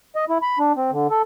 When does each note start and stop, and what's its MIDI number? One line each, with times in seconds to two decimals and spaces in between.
0.16 0.25 75
0.29 0.38 64
0.42 0.58 83
0.59 0.73 62
0.76 0.91 60
0.91 1.07 50
1.11 1.22 69